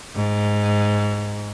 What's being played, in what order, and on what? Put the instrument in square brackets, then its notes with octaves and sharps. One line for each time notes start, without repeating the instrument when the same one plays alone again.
[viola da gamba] G#2